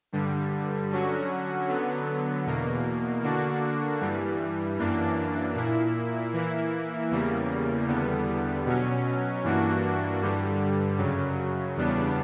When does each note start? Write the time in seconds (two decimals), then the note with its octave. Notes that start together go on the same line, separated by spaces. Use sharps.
0.12 G2 D3 G3
0.90 D3 F#3 C#4 F#4
1.68 D3 F#3 B3
2.46 E2 B2 A#3
3.23 D3 A#3 D4 F#4
4.01 G2 E3 G3
4.78 F#2 E3 A#3 D4
5.56 A#2 A#3 E4
6.33 E3 A#3 E4
7.10 E2 C#3 G3 A#3
7.88 E2 D3 G3 B3
8.66 B2 F#3 C#4
9.44 G2 E3 A#3 D4 F#4
10.20 G2 D3 G3
10.98 F#2 C#3 F#3
11.76 E2 C#3 G3 B3 D4